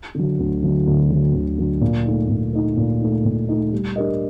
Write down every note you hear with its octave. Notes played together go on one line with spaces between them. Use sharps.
D3 F#3
D2
D3 F#3
D2
D3 F#3
D2
D3 F#3
A#2
A3 D#4
A#2
A3 D#4
A#2
A3 D#4
A#2
A3 D#4
G3
D4 G4 A#4 D#5